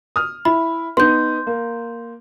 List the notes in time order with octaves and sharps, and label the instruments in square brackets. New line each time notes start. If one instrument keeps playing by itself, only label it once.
[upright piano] D#6 F6
[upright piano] E4 [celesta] B5
[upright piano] B3 D#4 [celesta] C6 G6
[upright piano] A#3